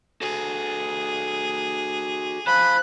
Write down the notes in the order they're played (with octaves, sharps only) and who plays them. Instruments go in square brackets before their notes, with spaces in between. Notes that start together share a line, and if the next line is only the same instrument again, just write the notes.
[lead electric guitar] F#4 A4 [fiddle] G#4
[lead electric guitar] C5 F5 [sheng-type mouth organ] B5 [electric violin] F#6